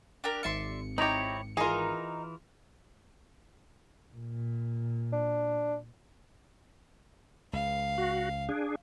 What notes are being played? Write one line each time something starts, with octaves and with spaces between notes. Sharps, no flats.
D4 G4 A#4
G#1 D5 E5 C6 C#7
C4 D#4 E4 G4 C#5 A#5
E3 D#4 F4 G#4 A#4
A#2
D4
C#2 F5
F#4
D4 G#4